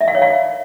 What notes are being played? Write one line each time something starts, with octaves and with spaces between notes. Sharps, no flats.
E5
F5
C#5
F5